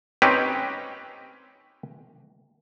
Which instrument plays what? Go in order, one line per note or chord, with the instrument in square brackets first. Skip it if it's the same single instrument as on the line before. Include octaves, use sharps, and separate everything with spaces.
[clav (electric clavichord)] C4 C#4 D#4 G4 B4